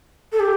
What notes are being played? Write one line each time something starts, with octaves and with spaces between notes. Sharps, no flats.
A4
G4